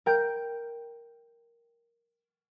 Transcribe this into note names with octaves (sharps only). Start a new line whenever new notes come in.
A#4 G5 G6